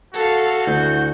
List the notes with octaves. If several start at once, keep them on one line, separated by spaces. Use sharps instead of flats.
F#4 A4 F5
D2 E4 G6